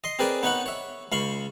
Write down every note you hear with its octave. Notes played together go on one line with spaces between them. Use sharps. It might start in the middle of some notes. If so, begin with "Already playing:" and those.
D#5 C6
C4 G#4 A#4 B4 D5 G#5
B3 D#4 B4 C#5 F#5 B5
C#5 E5
C#2 F5 B5 C#6